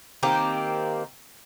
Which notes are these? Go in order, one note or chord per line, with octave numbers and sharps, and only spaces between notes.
D#3 A#3 C4 G4